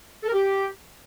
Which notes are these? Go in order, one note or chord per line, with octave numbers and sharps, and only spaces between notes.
A4
A#4
G4